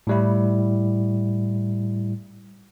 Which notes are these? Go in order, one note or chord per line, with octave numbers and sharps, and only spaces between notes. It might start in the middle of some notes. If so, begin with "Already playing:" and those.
A2 G3 E4